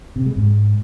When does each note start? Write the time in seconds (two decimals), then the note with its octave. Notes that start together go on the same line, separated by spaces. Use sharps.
0.16 C3
0.26 G#3
0.36 G#2